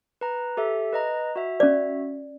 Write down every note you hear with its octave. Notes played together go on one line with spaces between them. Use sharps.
B4 A#5
G4 A4 E5
B4 D#5 A#5
F#4 E5
C#4 D5